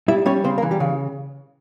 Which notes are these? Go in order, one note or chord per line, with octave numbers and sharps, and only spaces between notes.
G3 E4 E5
G3 C#4 C#5
C#3 C4 C5
A#3 A#4
E3
G3 G4
C#3